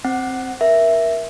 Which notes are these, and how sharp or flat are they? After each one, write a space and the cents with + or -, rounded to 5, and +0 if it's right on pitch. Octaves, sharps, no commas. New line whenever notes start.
C4 +0 F#5 +15
A#4 +25 E5 +0